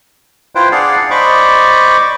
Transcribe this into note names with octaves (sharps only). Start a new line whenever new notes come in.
E4 F4 B4 C5 G5
D4 G#4 D5 F5 F#5
C5 D5 D#5 B5 C#6 D6